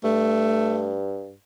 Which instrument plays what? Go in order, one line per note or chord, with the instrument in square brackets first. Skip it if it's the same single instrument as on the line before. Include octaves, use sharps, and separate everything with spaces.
[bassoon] G2 [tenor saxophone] A3